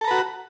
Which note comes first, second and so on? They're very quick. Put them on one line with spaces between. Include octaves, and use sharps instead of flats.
A4 A#5 B4 F#4